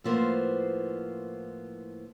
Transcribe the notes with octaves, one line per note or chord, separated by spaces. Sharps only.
A2 F3 A#3 B3 C5